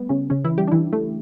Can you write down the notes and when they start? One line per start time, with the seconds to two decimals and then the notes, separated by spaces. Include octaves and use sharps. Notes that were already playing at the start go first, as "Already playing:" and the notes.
Already playing: G3 A3 B3
0.09 C#3 C#4
0.30 C#3 C#4
0.44 E3 E4
0.58 G3 G4
0.68 D4
0.72 E3 E4
0.93 A3